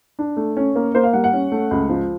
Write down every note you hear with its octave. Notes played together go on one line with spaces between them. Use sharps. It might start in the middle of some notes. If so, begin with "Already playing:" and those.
D4
A3
C#4
A#3
A#3 C5
F5
G3 F#5
F#5
C#4
A3
C#2
F3